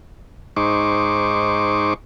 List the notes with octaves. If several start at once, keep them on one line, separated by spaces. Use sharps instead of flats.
G#2 D#4 C5 C#6 D6